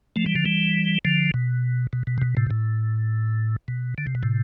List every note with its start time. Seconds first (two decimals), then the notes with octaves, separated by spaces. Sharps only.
0.16 F3 A3
0.26 E3 G3
0.35 D3 F3
0.45 E3 G3
1.05 D3 F3
1.34 B2
1.93 B2
2.07 B2
2.18 C3
2.22 B2
2.37 A2 C3
2.51 A2
3.68 B2
3.98 D3
4.07 C3
4.15 B2
4.23 A2 C3